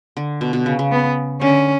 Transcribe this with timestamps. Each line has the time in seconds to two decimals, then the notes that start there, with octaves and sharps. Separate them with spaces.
0.17 D3
0.41 B2
0.53 B2
0.66 C#3
0.79 C#3
0.92 B3
1.41 D3 C#4